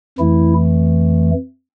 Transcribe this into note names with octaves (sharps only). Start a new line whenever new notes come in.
F2 E3 A3 E4